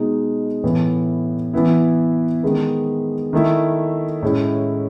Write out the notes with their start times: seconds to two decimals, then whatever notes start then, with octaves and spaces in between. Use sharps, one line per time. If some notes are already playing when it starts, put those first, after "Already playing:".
Already playing: B2 G#3 D#4
0.64 A2 E3 B3
1.54 E3 B3 E4
2.43 D#3 G#3 B3
3.33 D#3 A3 E4
4.23 A2 G#3 C#4 E4